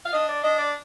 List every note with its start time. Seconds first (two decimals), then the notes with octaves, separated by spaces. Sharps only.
0.04 F5
0.12 D4 D#5
0.27 D5
0.42 D4 D#5
0.58 D5